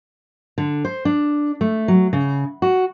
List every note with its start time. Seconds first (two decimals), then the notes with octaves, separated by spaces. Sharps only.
0.58 D3
0.85 C5
1.05 D4
1.61 A3
1.88 F#3
2.13 C#3
2.62 F#4